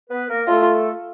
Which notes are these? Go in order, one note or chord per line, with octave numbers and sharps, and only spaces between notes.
B3 B4
A#3 A#4
A3 F4 A4